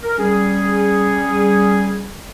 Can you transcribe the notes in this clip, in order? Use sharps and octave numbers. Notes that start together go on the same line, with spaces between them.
A#4
G3 C#4 G#4